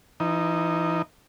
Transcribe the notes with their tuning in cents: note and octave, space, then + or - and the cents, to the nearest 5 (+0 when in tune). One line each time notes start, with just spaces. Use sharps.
E3 +35 D#4 +0